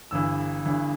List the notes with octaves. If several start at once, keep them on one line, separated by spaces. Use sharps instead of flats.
G1 G2 E3 E6
G1 G2 E3